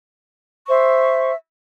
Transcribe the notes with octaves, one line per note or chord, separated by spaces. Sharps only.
C5 E5 C#6